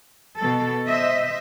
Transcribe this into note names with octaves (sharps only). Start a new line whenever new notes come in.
B2 A4
C5 D#5 E5